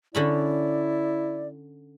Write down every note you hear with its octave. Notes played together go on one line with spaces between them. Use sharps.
D3 C#4 E4 D5 B5